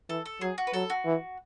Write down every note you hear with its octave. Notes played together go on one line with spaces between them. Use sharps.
E3 A4
A4
F#3 G#4
F#4
B4
F#3 A4
F#4
E3